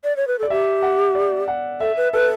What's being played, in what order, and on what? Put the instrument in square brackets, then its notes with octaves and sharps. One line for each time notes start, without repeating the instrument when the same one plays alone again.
[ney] D5
C#5
B4
[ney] A4 [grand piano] D5
[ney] G4 [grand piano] E5
[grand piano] F#5
D5
F#5
[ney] A4 [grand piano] E5
[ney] B4
[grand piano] A4 [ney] B4